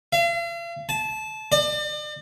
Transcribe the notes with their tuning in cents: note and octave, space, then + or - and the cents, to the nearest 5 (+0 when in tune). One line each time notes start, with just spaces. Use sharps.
F5 -45
A5 -20
D5 +40